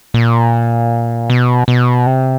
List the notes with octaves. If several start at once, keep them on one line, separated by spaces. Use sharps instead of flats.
A#2
B2
B2
C3